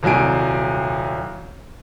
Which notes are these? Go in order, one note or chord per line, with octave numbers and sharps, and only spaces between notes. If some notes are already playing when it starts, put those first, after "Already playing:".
D#1 C2 F#3 G#5 D7